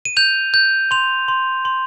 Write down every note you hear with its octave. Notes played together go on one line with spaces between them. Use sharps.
D#7
G6 F7
G6
C6 F7
C6
C6